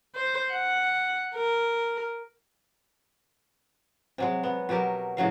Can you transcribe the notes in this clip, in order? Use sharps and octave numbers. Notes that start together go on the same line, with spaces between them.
C5
F#5
A#4
C3 F#3 G#3
B3
B2 F#3 G4 A#4
A2 C#3 F#3 F5